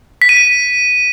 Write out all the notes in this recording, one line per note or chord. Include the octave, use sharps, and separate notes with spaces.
B6
D#7
B6